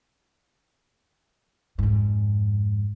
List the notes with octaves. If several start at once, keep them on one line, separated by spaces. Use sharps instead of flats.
F2 G#2